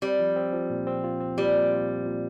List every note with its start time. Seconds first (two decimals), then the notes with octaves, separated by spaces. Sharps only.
0.02 G3 C4
0.19 F3
0.36 C4
0.53 F3
0.70 A#2
0.87 C4
1.04 F4
1.20 C4
1.37 A#2 G3
1.55 A#2
1.72 F4
1.89 C4
2.06 A#2